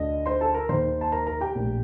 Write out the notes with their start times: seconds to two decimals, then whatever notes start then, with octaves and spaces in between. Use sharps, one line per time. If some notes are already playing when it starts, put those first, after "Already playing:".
Already playing: D2 D3 D#5
0.26 C5 C6
0.41 A4 A5
0.54 A#4 A#5
0.69 D#2 D#3 C5 C6
1.01 A5
1.12 A#4 A#5
1.27 A#4 A#5
1.41 G4 G5
1.55 A#1 A2